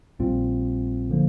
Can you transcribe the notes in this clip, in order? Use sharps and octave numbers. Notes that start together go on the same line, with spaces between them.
A#1 A#2 G3 C4 F4
D3 F3 A#3